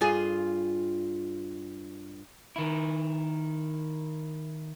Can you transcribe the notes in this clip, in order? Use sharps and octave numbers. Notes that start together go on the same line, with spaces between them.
G2 F4 G#4
D#3 E4